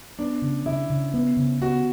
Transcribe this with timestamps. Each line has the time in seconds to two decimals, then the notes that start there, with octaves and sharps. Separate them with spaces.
0.19 B3 D4
0.42 C#3
0.66 C#3 E4
0.90 C#3
1.14 B3
1.37 C#3
1.61 B3 F#4